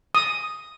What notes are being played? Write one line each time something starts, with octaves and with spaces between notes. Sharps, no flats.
D#6